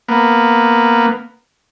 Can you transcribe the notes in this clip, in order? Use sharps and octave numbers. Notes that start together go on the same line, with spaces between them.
A#3 B3